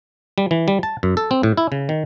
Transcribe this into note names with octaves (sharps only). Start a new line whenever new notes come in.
G3
E3
G3
A5
F#2
A4
C4
A2
E4
C#3
D#3